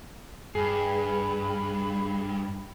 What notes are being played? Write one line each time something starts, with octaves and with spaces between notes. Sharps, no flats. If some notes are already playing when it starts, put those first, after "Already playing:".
G2 G#4 B5